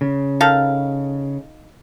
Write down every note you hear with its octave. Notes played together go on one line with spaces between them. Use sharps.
C#3
D#3 A4 F5